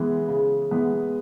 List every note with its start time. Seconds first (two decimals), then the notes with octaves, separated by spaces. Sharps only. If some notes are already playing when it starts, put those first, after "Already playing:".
Already playing: E3 G#3 B3
0.28 C#3
0.71 E3 G#3 B3